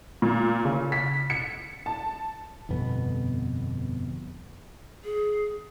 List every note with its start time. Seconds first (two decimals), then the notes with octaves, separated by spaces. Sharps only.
0.22 A#2
0.65 C#3
0.92 B6
1.30 C#7
1.86 A5
2.69 G1 F2 B2 B3
5.04 G#4